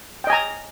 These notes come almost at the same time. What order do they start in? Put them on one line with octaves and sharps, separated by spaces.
G5 D#5 G#5 A#5